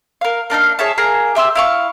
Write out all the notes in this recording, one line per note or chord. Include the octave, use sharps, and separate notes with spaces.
A#4 F5
A#3 D4 D#4 F5
G#4 C#5 E5 A5
A#3 G#4 A#5
G4 E5 C6 E6
E4 F5 C#6